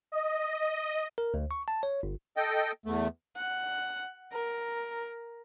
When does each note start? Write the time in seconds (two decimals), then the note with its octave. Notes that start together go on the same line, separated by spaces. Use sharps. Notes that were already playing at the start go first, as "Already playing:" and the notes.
0.12 D#5
1.18 A#4
1.34 D2
1.51 C#6
1.68 A5
1.83 C#5
2.03 G1
2.37 A4 D#5 G5
2.86 E2 A3
3.37 F#5
4.33 A#4